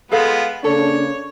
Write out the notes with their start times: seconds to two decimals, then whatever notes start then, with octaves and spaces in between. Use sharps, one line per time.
0.11 G#3 B3 F4 G#4 A4 F5
0.64 C#3 A#3 D4 A4 C#5